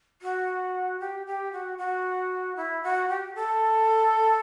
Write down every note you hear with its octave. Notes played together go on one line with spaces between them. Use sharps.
F#4
G4
G4
F#4
F#4
E4
F#4
G4
A4